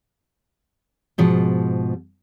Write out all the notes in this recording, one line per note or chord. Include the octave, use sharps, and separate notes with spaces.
G#2 B2 F3